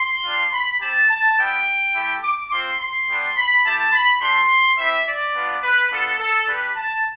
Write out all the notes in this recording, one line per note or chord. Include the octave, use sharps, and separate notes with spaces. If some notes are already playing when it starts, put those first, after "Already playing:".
Already playing: C6
G3 D4 F4
B5
C4 G4 A5
A5
G3 B3 E4 G4 G5
A3 E4 G4
D6
C4 F4 C6
C6
G3 B3 D4
B5
A3 E4 G4 A5
B5
A3 D4 G4 C6
C4 E4 G4 E5
D5
B3 D4 F4
B4
B3 D4 F4 A4
A4
G3 D4 G4 B4
A5